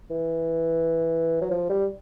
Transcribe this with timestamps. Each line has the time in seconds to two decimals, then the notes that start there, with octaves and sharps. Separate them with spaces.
0.10 E3
1.41 F#3
1.50 F3
1.69 G3